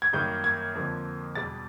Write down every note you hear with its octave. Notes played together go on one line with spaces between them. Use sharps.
G#6
F#2 D#3 G3 A#3 D#4 G6
G#6
F2 D3 F3 A#3
E1 E2 B2 G3 A6